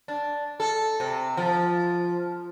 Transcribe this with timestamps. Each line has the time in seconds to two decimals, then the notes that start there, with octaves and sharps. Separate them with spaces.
0.08 D4
0.60 A4
1.00 C3
1.37 F3